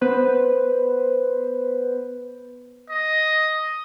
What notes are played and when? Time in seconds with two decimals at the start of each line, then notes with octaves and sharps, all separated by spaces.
0.01 B3 B4 C5
2.90 D#5